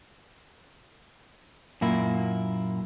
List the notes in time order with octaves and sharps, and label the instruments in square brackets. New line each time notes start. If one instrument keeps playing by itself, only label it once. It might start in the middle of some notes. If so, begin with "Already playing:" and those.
[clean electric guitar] F#2 A#2 A#3 E4